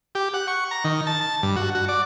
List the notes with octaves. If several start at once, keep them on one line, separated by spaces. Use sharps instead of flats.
G4
F#5
C#6
A#5
D#3
A5
A5
G2
F#4
F#4
D5